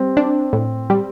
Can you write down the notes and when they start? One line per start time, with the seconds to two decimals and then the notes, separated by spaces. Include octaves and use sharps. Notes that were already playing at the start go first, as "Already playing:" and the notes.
Already playing: G3 C4
0.17 D4
0.53 A2
0.90 G3